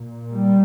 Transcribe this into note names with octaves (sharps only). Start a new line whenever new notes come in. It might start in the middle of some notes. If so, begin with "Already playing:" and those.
Already playing: A#2
G3